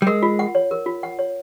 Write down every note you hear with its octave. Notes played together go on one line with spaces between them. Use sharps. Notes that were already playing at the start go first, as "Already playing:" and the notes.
G3
G#3 A#4
F4
F#5
C#5
A#4
F4
F#5
C#5